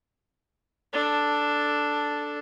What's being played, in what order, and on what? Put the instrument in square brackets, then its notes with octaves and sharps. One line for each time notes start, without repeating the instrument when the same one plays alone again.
[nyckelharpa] D4 A4